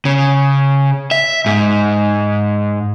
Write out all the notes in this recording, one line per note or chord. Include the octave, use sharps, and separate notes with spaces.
C#3
E5
G#2